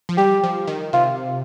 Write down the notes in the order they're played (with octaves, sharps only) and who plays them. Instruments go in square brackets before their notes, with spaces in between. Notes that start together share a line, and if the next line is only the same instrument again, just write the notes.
[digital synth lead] F3
[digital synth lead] G3 [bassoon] G4
[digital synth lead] F3
D#3
[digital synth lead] C3 [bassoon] F4